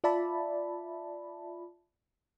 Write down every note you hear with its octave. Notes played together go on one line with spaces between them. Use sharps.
F4 D5 E5 A5 B5